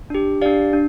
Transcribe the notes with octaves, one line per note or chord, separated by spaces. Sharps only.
D4 G4
D4 G4 D5 F5
D4